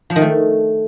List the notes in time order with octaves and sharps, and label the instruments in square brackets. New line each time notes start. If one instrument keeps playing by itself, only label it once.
[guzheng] F3
D#3
A3